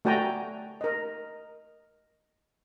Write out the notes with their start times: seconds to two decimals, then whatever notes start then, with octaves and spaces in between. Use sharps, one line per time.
0.05 A3 F#4 D5 G5 G#5 A#5
0.81 A#4 D#5